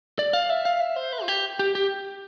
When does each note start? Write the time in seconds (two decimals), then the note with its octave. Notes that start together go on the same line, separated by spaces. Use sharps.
0.19 D5
0.33 F5
0.50 E5
0.65 F5
0.80 E5
0.96 C5
1.13 B4
1.23 F4
1.28 G4
1.59 G4
1.75 G4